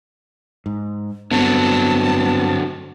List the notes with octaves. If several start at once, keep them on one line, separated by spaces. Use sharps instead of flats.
G#2
G2 D3 F#3 B3 C4 A5 A6